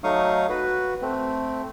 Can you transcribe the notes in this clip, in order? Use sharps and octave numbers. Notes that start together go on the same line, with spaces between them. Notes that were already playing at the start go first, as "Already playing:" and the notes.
F#3 A3 D#4 F5 C#6 D#6
F#4 B4
A3 C4